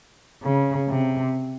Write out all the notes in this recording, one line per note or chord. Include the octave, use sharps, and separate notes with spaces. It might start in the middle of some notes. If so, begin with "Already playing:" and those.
C#3
C3